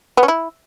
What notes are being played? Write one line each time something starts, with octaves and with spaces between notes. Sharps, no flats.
B3
C#4
E4